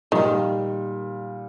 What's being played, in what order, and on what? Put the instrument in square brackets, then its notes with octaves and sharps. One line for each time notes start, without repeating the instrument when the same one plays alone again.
[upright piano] A#2 G3 A#3 [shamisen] D#3